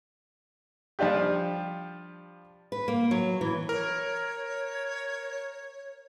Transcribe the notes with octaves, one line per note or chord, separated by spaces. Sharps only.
F3 G3 D4 F4 G4
B4
A#3
F#3
E3
A#4 C#5